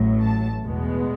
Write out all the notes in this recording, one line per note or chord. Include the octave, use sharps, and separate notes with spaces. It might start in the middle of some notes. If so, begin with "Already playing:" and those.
Already playing: A1 A2 F#3
A5
E2 B2 G#3 B3